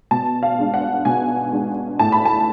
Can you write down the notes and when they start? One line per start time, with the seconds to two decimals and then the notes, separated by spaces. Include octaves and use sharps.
0.11 B2 A5
0.43 F5
0.59 G#3 D4
0.74 F#5
1.05 B2 G#5
1.52 G#3 D4
1.99 A2 A5
2.12 B5
2.25 A5